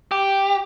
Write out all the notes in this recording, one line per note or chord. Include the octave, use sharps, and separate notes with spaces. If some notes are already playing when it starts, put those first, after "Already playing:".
G4